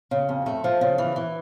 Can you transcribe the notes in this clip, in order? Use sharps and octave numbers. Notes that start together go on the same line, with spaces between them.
C#3
F2
A3
F3
C#3
E3
E3